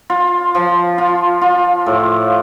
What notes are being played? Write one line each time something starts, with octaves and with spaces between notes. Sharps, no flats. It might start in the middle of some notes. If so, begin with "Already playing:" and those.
F4
F3
F4
F4
A2